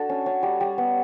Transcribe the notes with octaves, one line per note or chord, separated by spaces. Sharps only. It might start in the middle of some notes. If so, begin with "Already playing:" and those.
Already playing: D4 F#4 A4
C#4
C#4
G3
G3
B3